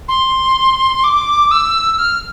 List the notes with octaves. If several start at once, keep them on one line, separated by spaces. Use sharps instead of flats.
C6
D6
E6
F6